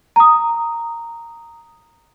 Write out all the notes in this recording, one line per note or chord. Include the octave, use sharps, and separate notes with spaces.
A#5 D#6